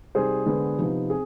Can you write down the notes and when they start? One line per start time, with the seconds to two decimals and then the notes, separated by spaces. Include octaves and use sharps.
0.15 C3 G3 C4 D#4 G#4 C5
0.46 D3 G#3 B3
0.78 C3 F3 B3 D#4
1.09 C4 G#4